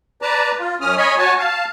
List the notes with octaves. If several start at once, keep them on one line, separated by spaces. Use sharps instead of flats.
B4 D5 A5 A#5
F4
F#2 C#4 D#6 F6
C#5 D#5 G#5 B5
F#4 C#5 G#5 A5
F5 A5